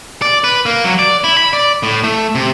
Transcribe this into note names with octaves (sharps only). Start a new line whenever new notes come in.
D5
B4
A#3
F#3
D5
E4
B5
D5
A2
A3
C3